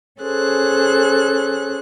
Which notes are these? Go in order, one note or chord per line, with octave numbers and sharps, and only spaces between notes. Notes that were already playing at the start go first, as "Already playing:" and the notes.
C#4 G#4 A4 C5 F#6